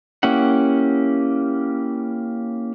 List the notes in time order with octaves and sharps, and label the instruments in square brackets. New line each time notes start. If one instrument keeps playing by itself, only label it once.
[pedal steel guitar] A#3 C#4 E4 G4 F#5